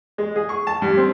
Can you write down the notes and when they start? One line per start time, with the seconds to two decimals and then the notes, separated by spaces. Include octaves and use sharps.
0.18 G#3
0.36 G#4
0.49 C#6
0.67 A5
0.82 G2
0.97 C4